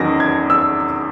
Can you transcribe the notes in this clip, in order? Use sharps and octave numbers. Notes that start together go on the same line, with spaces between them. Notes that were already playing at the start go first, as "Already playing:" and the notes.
Already playing: E2 D#3 F#3 C#4 A#6
G#6
E6